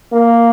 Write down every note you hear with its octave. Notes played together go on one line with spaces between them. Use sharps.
A#3